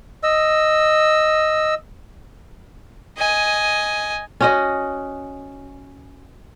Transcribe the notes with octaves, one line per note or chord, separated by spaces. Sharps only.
D#5 E6
D#5 G#5
C#4 F#4 D#5